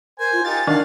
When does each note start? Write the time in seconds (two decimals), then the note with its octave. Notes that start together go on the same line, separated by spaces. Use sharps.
0.19 A#4 C5 G#5
0.33 F4
0.44 D#4 F4 G4 G#5 A6
0.67 D#3 D4 F5 F#5